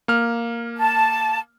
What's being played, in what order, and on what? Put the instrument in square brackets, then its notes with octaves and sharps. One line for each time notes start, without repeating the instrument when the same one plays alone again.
[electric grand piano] A#3 F6
[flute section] A5